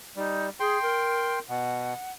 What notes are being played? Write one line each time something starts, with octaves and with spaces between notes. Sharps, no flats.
G3 D#4
G#4 G5 C6
A#4
B2 F#5